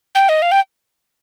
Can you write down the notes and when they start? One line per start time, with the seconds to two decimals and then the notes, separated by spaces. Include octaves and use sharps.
0.15 G5
0.29 D#5
0.42 F5
0.52 G5